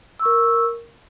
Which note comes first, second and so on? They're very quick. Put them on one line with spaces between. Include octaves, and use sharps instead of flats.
E6 C#6 A#4